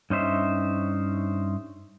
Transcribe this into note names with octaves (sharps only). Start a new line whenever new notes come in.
G2 C#4 D#4 C5 E5